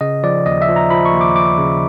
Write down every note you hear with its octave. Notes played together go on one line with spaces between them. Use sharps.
C#3 D#5
F3 D5
D#2 D#5
E5
F3
A#5
F3 B5
C#6
D#2
D6
F3 D6
C#3